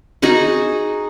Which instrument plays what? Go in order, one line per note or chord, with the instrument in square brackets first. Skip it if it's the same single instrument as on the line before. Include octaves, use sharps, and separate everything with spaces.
[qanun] D#4 F#4 G#4 F#5